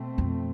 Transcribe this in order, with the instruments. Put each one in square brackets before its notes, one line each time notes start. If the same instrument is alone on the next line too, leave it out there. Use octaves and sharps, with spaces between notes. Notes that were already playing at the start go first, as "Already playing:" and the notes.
Already playing: [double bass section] B2 A3 C4
[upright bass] F2